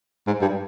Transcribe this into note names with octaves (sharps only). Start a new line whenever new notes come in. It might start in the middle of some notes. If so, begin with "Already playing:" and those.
G#2
G2